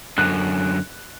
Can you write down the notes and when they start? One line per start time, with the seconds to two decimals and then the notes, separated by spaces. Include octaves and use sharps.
0.18 F#2 D3 F#6